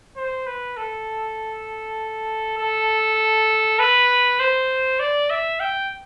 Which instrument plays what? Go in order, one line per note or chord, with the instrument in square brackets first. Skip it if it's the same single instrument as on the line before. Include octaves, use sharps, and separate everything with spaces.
[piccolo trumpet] C5
B4
A4
A4
B4
C5
D5
E5
G5